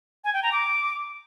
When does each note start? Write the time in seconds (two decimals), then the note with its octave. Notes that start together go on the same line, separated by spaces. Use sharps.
0.24 G#5
0.34 G5
0.43 A#5
0.52 D6